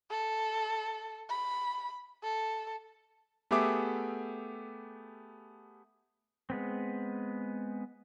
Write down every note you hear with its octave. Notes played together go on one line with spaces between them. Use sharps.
A4
B5
A4
A3 B3 G4 G#4 E5 D6
G#3 B3 C4